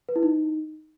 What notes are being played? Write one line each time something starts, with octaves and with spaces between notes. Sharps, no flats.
B4
E4
D#4